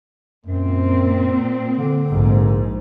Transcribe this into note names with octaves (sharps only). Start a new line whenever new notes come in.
F#2 A#2 C4
D3
A#1 G#2